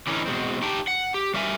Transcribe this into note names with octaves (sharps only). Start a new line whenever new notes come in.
D3 E3 C#4 D#4
B2 G#3 C4
D#4 G4 G5 A5
F#5
G4
G3 G4 A#4 E5 F#5 G#5